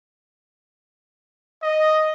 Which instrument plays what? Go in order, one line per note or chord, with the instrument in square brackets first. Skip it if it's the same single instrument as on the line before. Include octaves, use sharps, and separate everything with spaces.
[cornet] D#5